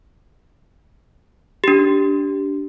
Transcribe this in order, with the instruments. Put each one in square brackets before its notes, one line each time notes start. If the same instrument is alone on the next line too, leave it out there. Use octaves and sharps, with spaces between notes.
[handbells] D4 G4